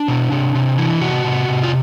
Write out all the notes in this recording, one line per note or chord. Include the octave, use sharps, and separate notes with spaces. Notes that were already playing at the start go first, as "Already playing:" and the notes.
Already playing: D4
B2
C3
C3
E3
C3 F#4
C3
C3
F4